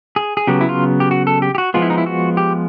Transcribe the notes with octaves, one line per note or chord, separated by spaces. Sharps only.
G#4
G#4
C#3 F#3 B3 G4
E4
F4
G4
F#4
A4
G4
G4
F#4
F3 G#3 B3 F4
E4
D#4
E4
F#4
G4